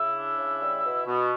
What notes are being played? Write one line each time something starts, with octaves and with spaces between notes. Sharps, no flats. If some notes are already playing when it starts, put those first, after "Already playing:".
Already playing: C#3 E4 E5
D4
C#3
G3
B2
B2